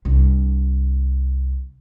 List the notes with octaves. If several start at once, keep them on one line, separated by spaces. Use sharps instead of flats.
C2 D4